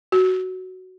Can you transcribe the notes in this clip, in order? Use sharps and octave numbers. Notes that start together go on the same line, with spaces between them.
F#4